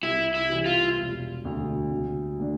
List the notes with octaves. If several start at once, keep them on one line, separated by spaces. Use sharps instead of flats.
C2 E4
E4
C3 E3 G3
F4
E1
D2 D3
D2
D3 A3 D4